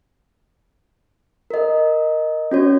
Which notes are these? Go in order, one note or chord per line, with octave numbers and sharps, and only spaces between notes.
A#4 D#5
C#4 F#4 C#5